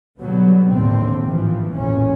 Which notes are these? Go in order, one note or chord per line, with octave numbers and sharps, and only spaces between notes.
B2 D3 F#3 G3 B3
A#1 D#2 A2 D3 C4
G#2 E3 F3
A1 E2 A#2 C#4